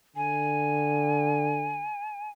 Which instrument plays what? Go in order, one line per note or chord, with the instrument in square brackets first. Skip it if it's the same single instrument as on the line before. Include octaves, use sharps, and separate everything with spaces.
[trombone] D3 [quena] G#5